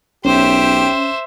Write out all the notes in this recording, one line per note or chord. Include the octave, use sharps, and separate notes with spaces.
B1 C#4 G4 C5 E5